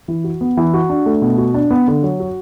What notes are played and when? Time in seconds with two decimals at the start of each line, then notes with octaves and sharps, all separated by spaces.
0.08 E3
0.24 F#4
0.41 B3
0.57 E3
0.74 F#4
0.89 D4
1.06 A3
1.22 B2
1.38 F#4
1.54 D4
1.71 B3
1.88 D3
2.03 F#3
2.20 F#4